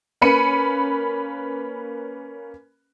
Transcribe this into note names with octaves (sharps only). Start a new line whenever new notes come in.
A#3 C#4 B4 B5 C#7 D#7